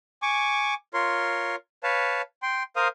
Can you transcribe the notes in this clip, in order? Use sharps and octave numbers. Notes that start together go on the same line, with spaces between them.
G#5 C#6 D6
F4 A#4 C#5 C6
B4 C#5 F5 A5
G5 C6
A#4 C5 F5 D#6